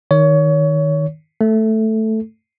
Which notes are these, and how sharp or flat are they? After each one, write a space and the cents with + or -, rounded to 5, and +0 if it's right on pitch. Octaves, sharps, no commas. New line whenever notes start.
D#3 +0 C#5 +25
A3 +0 A4 +0